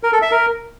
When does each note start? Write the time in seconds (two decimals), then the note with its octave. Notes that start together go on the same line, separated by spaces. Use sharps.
0.03 A#4
0.13 A4
0.22 E5
0.32 A#4